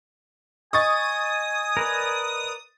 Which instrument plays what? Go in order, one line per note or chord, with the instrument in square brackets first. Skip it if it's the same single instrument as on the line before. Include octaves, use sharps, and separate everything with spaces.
[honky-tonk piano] D#5 C#6 A6 [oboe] G#5 [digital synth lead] D#6
[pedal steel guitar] A#4 B4 D5